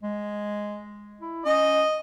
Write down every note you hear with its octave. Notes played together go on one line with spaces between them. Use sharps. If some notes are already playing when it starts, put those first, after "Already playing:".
G#3
E4
C#4 D#5